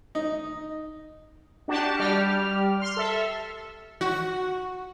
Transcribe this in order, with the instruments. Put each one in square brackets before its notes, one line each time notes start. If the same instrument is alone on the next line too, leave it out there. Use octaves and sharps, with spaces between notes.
[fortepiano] D#4
[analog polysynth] D4 F#4 G4 A5
G3 G4 F6
C6 F6
A4 E5
[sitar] F#4